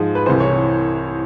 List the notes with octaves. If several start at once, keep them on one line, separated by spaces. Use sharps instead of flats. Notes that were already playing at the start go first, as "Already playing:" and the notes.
Already playing: G#2 F3 G#3
B4
C2 C3 E3 C5
C#5